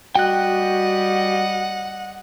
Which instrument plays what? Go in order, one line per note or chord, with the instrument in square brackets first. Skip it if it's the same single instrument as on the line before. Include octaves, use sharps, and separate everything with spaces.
[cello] G3 D#5 [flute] F#4 [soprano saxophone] F#5 [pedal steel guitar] G5 F#6